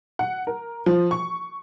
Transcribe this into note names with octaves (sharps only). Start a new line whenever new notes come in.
F#5
A#4
F3
C#6